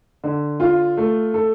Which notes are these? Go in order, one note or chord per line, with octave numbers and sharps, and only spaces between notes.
D3
F4
A3
A4